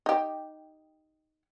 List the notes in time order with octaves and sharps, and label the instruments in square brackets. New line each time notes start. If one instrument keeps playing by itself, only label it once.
[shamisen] D#4 G4